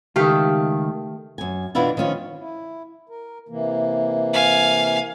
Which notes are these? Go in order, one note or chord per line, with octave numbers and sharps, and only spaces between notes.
C#2 D#3 A3 G4 F5
F#2 G#5
B2 E3 B3 D4 E4 F4
D#3 F3 C#4 F4
E4
A#4
C3 E3 A#3
F5 G#5